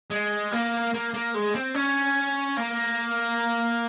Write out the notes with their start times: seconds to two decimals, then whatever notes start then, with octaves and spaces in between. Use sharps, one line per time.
0.11 G#3
0.53 A#3
0.94 A#3
1.14 A#3
1.34 G#3
1.55 C4
1.75 C#4
2.57 A#3